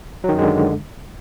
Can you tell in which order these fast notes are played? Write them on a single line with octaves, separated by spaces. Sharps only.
F#3 D#3 F#2 G#3 D3